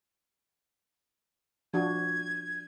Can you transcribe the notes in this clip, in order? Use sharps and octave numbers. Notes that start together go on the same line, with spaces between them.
F3 D4 F#4 G#6